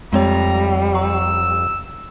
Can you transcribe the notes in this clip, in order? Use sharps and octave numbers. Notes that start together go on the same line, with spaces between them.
F2 G3 G#3 C4 C#5 A#5
A#5 C#6 E6